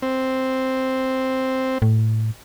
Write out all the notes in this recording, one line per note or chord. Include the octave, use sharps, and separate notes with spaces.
C4
A2